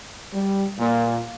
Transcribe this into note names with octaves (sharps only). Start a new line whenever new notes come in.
G3
A#2